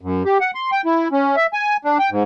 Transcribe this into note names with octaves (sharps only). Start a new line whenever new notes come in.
F#2
G4
F#5
C6
G5
E4
C#4
E5
G#5
D4
G5
G#2